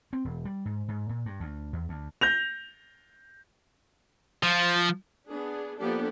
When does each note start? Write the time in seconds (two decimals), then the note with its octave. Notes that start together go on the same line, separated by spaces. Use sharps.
0.13 C4
0.25 E1
0.45 G3
0.65 G#2
0.88 G#2
1.09 A#2
1.26 G2
1.40 D2
1.73 E2
1.89 D2
2.21 G6 A#6 F7
4.43 F3
5.29 B3 D4 G#4
5.79 F3 A#3 B3 D4 G4 A4